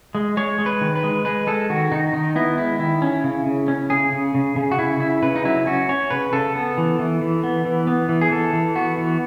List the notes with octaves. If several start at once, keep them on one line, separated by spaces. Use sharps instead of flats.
G#3
G#3 C#5
G#3
B4
D#3
B4
G#3
G#3 B4
G#3 A4
D#3 F#4
D#3 D#4
D#3 D#4
B3 E4
G#3 E4
D#3 E4
C#4
C#3
C#3
C#4
C#3 G#4
C#3
C#3
C#3
F#4
C#3 E4
C#3 E4
C#3 B4
D#4
F#3 E4
C#4 F#4
C#4 C#5
C#3 B4
C#3 A4
B3
E3
E3
E3
B3
E3
B3
E3
G#4
E3 A4
E3
B3 F#4
E3